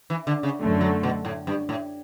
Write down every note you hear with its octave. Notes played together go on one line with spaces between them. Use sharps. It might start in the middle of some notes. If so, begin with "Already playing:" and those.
E3
D3
C#3
F#2 D3 A3
F#3
B2
A2
G2
A2